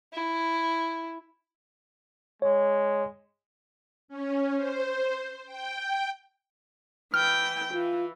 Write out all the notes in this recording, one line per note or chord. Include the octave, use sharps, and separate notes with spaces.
E4
G#3 C#5
C#4
C5
G5
E3 G5 F6
E3 F4